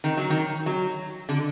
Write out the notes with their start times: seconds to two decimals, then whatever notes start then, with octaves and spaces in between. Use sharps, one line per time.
0.04 D#3
0.17 F#3
0.30 D#3
0.66 F#3
1.29 D3